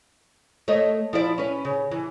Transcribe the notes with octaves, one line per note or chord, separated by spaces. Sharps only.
A3 C#5 D#5
F3 E4 D5
C#4 B4
C#3
E3